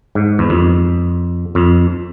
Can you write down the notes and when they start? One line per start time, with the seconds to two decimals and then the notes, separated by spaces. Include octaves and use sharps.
0.15 G#2
0.39 E2
0.50 F2
1.55 F2